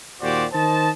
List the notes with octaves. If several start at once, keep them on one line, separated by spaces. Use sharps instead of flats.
D#2 A#2 F#4 G4 C5 D5
D#3 C5 D#5 A5